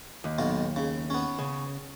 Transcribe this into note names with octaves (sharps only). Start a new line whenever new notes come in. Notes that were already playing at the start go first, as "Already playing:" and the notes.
D#2
B1 B2 F5
C#3
B3 C#4
C#3